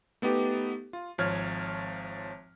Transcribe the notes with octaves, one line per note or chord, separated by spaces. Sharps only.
A3 B3 D#4 G4
F4
G#1 F3 C#5 F6 G#6